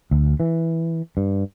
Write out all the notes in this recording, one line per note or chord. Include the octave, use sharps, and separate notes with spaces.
D2
E3
G2